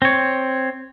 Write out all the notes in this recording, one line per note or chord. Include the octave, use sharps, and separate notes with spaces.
C4 C#5